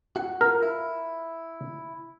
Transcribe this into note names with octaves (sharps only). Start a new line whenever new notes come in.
F#4 F#5
F4 A#4
E4